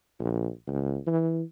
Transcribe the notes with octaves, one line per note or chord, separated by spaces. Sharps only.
A#1
C#2
E3